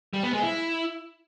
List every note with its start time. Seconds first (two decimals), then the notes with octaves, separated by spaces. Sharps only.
0.13 G3
0.23 B3
0.33 G#3
0.43 E4